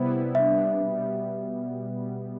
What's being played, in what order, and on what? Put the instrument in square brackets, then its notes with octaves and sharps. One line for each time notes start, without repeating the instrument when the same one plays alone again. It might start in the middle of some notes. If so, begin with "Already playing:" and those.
Already playing: [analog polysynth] C3 G3 B3 E4 [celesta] C5
[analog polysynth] C3 G3 B3 D4 [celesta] E5
[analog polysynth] B2 G3 B3